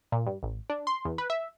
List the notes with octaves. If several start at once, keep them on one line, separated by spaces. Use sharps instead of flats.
A#2
G2
A1
D4
C6
E2
B4
E5